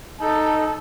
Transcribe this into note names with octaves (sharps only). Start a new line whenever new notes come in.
D#4 A4